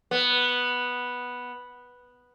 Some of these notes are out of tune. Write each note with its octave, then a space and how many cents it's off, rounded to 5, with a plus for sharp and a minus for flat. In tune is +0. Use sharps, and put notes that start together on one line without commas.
B3 -5